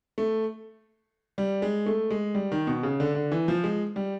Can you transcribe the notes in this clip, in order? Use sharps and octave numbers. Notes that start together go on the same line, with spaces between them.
A3
G3
G#3
A3
G#3
G3
D#3
B2
C#3
D3
D3
E3
F3
G#3
G3